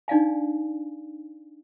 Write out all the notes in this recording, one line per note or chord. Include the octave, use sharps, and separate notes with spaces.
D4 D#4 D5 F5 G#5